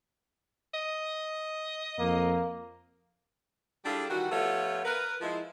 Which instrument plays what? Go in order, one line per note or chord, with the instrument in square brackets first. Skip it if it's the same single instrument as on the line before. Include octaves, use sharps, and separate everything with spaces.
[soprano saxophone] D#5
[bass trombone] F2 [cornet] A#3
[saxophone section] G3 D4 E4 F4 G#4 A4
D#3 E3 G3 F#4
F3 A3 B3 F4 G4 C#5
A#4 B4
F3 G#3 E4